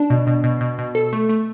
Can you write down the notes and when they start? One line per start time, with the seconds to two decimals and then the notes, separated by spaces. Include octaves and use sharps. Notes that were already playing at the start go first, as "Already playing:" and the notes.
Already playing: D4
0.10 B2
0.27 B2
0.44 B2
0.61 B2
0.78 B2
0.95 A4
1.13 A3
1.29 A3